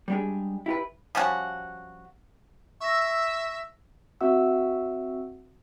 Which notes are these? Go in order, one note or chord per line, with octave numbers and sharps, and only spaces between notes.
G3 G#3 B3 D4 G4 G#4
E4 G4 A4 B4
F3 G3 C#4 F#4
E5 C#6 E6 A#6
C4 F#4 E5 F#5 E6